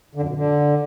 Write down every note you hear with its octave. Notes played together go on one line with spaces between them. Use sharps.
D3
F#2
B2
D3